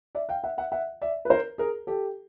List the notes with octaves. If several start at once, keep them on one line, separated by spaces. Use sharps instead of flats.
D5 E5
F5 G5
E5 F#5
E5 F#5
E5 F#5
D5 E5
B4
A#4 C5
G#4 A#4
G4 A4